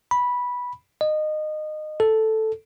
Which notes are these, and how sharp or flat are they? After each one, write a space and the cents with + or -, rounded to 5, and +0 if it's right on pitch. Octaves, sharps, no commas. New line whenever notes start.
B5 -10
D#5 -20
A4 +0